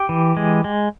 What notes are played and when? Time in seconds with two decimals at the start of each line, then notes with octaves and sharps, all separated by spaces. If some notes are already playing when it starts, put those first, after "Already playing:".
Already playing: G4
0.09 E3
0.37 G#3
0.64 G#3